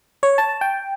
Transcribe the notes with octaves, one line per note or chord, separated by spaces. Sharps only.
C#5
A5
G5